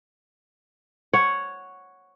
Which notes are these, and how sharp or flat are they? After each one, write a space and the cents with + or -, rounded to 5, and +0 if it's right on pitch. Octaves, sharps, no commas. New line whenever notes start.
C#5 +0 F#5 +0